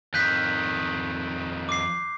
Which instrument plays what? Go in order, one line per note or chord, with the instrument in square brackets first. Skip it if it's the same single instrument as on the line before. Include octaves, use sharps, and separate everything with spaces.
[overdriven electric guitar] F2 D#3 [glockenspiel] F#6 G6 B6
[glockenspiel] D6 C7